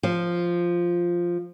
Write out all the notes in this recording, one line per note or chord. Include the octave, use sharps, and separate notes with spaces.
F3